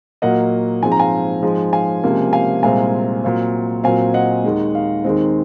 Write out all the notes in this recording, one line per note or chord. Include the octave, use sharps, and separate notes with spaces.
A#2 F#3 A#3 D#5 F#5
G#2 F3 G#3 C4 G#5
A#5
F5 G#5
G#2 F3 G#3
F5 G#5
C#2 C3 F3 A#3
F5 G#5
C2 A#2 G#3 C4 F5 G#5
A#2 F#3 C4 F5
A#2 F#3 C4 F5 G#5
D#5 F#5
D#2 D#3 G#3
F5
D#2 D#3 G#3 C4